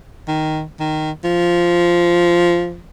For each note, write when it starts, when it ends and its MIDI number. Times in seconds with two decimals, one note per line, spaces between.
0.28 0.64 51
0.80 1.11 51
1.24 2.83 53